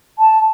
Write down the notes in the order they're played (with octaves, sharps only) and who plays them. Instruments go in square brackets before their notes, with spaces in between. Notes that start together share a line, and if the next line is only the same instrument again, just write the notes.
[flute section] A5